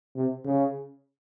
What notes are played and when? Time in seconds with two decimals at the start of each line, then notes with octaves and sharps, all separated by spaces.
0.16 C3
0.45 C#3